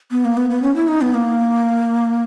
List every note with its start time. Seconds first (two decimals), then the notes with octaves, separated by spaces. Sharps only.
0.11 B3
0.25 A#3
0.37 B3
0.50 B3
0.62 C#4
0.76 E4
0.88 D#4
1.01 B3
1.14 A#3